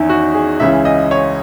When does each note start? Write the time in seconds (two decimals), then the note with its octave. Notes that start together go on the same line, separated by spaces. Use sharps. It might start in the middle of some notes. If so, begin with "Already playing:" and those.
Already playing: E2 D#3 C#4 D#4 E4
0.09 F#4
0.34 G#4
0.60 C#2 C#3 E3 E5
0.85 D#5
1.11 C#5